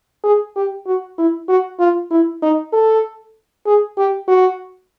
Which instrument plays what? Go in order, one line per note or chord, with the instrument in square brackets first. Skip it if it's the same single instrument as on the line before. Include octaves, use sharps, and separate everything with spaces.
[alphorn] G#4
G4
F#4
E4
F#4
F4
E4
D#4
A4
G#4
G4
F#4